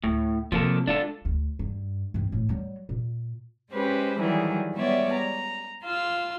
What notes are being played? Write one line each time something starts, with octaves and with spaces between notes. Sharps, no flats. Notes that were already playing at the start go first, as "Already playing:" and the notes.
D2 A2
C3 F3 A#3 A4
G#3 D4 F4 A4
D2
G2
G2 C4
A2
F#3 G3
A#2
G#3 C#4 G4 B4 C5
D#3 E3 F#3 G3 G#4
G3 G#3 B3 C#5 D5 E5
A#5
F4 F5 C6 E6